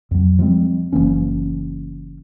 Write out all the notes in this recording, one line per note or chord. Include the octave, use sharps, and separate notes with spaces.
F2 F#3
F3 G3 G#3 C4
F#1 E3 A#3 C#4